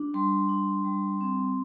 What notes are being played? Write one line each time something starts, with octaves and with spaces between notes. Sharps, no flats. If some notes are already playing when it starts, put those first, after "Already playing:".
Already playing: D4
G3 C6
D4
G3
C4